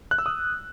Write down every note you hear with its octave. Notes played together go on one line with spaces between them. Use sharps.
F#6
E6
D#6